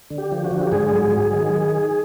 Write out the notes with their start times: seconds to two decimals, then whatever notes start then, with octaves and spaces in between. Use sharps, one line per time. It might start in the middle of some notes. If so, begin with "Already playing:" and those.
0.10 D3
0.18 G4
0.32 F3
0.44 F#4
0.51 D3
0.62 G4
0.72 G#2 G#4
0.92 F#3
1.12 F#3
1.33 D#3